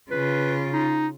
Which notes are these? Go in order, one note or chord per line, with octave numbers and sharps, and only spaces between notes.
C#3 F4 B4
D#4